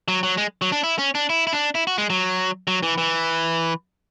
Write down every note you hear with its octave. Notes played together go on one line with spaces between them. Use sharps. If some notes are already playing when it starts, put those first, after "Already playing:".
F#3
F#3
G#3
F#3
D4
E4
C#4
D4
E4
E4
D4
E4
F#4
G#3
F#3
F#3
E3
E3